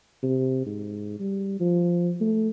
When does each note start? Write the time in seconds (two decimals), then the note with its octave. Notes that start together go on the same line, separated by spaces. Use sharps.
0.23 C3
0.66 G#2
1.19 G3
1.60 F3
2.21 A3